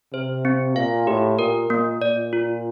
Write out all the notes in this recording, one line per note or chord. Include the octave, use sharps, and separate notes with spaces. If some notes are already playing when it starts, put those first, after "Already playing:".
C3 C5
C4
A#2 F5
A2 G4
A#2 A#4
A#2 A#3
A#2 D5
F4